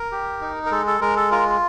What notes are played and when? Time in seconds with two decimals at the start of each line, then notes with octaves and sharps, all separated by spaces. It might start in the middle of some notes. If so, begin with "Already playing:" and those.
Already playing: A#4
0.12 G4
0.41 D#4
0.66 A#4
0.71 G#3 A4
0.87 A4
1.01 G#3 A#4
1.16 A4
1.31 F4 A#4